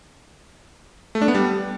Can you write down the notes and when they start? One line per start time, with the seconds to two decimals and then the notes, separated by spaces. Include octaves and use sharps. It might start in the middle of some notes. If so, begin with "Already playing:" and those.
1.15 A3
1.22 D4
1.28 B3
1.35 G3